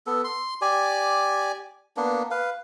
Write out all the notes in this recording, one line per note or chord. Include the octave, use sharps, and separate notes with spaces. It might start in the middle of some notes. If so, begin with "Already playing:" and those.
B3 A4
C6
G4 D5 G#5
A#3 B3 D4
B4 F5